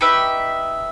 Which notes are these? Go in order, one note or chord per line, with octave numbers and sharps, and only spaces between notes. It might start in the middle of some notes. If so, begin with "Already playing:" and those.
D#4 G4 B4 E5